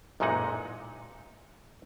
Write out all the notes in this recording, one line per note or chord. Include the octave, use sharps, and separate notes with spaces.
A1 F#2 A#2 G#3 D#4 F#5